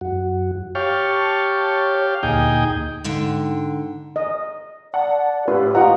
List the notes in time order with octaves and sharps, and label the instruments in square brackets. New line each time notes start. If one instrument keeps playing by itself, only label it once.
[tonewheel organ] F#2 F#4
[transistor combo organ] G4 F5 [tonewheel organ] C#5 A5 C#6
[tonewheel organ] D2 A#2 [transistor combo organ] D#4 G#4 G5
[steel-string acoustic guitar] G#2 D3 G5
[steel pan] D#5
[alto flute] D5 [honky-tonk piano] F#5 A5
[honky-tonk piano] A2 F4 [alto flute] G4 [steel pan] B4
[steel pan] F4 D#5 F#5 [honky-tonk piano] G5 A#5